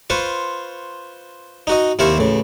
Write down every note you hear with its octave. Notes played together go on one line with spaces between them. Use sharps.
F4 B4 C5 C#6
D#4 F#4 D#5
D#2 C3 E4 C5 F5 C#6
A1 C#3